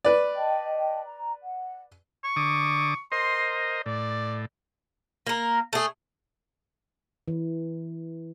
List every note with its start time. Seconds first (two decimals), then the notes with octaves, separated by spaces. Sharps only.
0.05 B4 D5
0.35 D#5 G5 A5
1.04 A#5
1.43 F#5
2.24 C#6
2.36 D3 D6 D#6
3.12 A#4 C5 D#5 C6
3.86 A2 D5
5.27 A#3 A#4
5.73 A3 G#4
7.28 E3